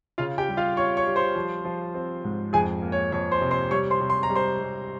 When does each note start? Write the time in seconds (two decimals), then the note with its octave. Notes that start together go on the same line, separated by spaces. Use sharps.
0.18 C#3 F4 F5
0.38 G4 G5
0.48 G3
0.57 F4 F5
0.77 F4 C#5 C#6
0.97 C#5 C#6
1.06 G3
1.16 C5 C6
1.35 F3
1.65 F3
1.94 C4
2.24 G#2
2.53 F2 G#4 G#5
2.82 A#3
2.92 C#5
3.12 F2 C#5
3.32 C5 C6
3.41 C3
3.51 C5 C6
3.71 G3 C#5 C#6
3.91 C5 C6
4.00 C3
4.10 C6
4.23 A#5
4.30 G3
4.36 C5 C6
4.59 G3